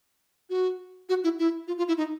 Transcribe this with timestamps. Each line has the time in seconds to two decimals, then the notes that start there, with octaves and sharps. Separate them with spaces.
0.50 F#4
1.09 F#4
1.24 E4
1.39 E4
1.67 F4
1.78 F4
1.88 E4
1.97 D#4